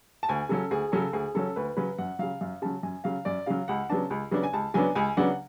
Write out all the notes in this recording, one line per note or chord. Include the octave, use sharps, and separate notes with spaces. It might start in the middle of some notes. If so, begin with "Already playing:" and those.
A5
D2 G#5
C#3 F#3 C#4 A4
D2 G#4
C#3 F#3 C#4 A4
D2 G#4
C#3 F#3 C#4 A4
D2 B4
C#3 F#3 C#4 B4
F#2 F#5
C#3 F#3 F5
F#2 F5
C#3 F#3 A5
F#2 G#5
C#3 F#3 F5
F#2 D5
C#3 F#3 F5
C#2 F#5
C#3 F#3 B3 D4 A5
C#2
C#3 F#3 B3 D4
G#5
C#2 A5
C#3 F#3 B3 D4 G#5
C#2 G#5
C#3 F#3 B3 D4 F#5